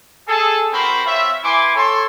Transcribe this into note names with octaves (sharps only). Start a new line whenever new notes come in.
G#4 A4
C4 F#4 A#4 C5 B5 C6
C4 F4 C#5 E5
E4 B4 G#5 C6 D6
A4 C#5 C6